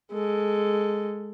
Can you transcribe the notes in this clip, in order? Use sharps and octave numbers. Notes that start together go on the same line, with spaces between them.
G#3 A4